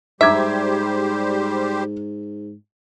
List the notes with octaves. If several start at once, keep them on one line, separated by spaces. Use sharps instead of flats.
G#2 G3 G4 C5 E5 A#5 D6 G#6